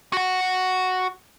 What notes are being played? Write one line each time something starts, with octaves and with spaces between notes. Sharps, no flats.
F#4 F#5